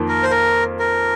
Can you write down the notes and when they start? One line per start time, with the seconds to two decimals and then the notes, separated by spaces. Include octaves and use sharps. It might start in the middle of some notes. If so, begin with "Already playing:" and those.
Already playing: F2 D#3 A#3 F4
0.08 A#4
0.23 C5
0.31 A#4
0.79 A#4